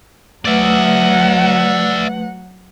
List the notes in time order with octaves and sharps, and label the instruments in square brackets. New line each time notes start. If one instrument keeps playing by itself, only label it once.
[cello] F#3 F#5 [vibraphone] A3 B4 [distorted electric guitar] D5 E5